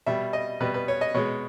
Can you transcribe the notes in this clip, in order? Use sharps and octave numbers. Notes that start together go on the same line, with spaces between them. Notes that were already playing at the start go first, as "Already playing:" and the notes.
B2 G3 E5
D#5
B2 G3 B4
B4
C#5
D#5
B2 G#3 C#5